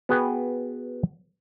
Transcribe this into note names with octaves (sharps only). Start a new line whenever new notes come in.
B3 F#4 G#4 B4 G5